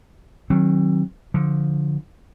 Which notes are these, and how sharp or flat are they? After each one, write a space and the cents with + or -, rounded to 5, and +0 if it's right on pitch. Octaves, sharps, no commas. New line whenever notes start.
D#3 -5 F#3 +0 C4 +35
D3 -10 F3 +0